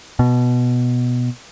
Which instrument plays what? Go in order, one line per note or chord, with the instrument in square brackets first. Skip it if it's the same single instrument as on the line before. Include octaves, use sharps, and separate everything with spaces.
[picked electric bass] B2